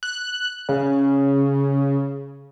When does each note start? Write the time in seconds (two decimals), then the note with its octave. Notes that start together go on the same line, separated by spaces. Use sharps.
0.03 F#6
0.69 C#3